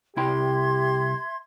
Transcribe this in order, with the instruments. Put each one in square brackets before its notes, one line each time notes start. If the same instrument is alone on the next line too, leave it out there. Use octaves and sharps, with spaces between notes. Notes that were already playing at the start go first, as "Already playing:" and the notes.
[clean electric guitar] C2 E4 G5 [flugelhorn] G4 [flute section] E5 C6 G#6